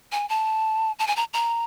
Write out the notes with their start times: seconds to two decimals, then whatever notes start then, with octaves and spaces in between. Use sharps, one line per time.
0.12 G#5
0.29 A5
0.99 A5
1.07 G#5
1.16 A#5
1.34 A#5